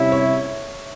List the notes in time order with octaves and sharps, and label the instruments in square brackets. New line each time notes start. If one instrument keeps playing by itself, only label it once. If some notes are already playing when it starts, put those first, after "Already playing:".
Already playing: [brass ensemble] C3 G3 C#4 E4 [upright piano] C#5 E5
[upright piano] C#5